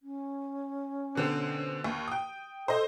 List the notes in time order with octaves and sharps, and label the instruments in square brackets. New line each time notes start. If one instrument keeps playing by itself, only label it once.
[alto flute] C#4
[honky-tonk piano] B2 D3 C4
D#2
G5 D#6
[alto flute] A4 [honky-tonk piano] C5 D#5